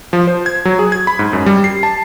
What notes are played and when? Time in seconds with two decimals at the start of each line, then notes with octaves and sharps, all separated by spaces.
0.13 F3
0.27 C5
0.46 G#6
0.65 F#3
0.79 G#4
0.92 G#6
1.07 B5
1.19 G#2
1.33 F#2
1.46 G3
1.64 C7
1.83 A5